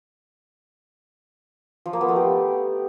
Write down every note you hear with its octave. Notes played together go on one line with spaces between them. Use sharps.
F3
A#3
B3
A3
G4